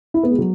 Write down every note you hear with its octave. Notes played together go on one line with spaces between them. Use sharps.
E4
B3
G#3
F#3